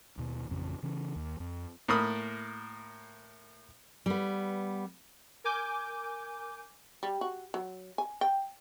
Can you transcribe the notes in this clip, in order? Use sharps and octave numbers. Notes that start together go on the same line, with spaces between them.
D#2 B2
A1 F2 C#3
C#3 E3 C#4
D#2
F2
A2 A#3 B5 D#6
G3 B3
A#4 G#5 D6 G6
G3
F#4
F#3
G#5
G5